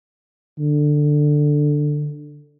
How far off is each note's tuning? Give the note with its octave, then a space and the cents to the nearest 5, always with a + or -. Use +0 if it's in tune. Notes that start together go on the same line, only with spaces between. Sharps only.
D3 +10